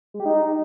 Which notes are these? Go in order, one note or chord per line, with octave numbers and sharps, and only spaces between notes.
G#3
G4
D#4